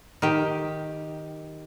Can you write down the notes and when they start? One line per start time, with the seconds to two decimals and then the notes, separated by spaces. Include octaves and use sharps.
0.22 D#3 G4